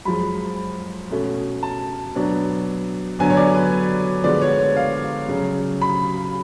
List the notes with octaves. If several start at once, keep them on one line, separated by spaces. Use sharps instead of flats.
F#2 F3 G#3 B5
B2 A3 C#4
A5
B2 F#3 B3 D4
D3 F#3 B3 D4 G#5
C#5
D5
B4
D3 F3 G#3 B3 D4 D5
C#5
C#5
F5
C#3 F#3 C#4
B5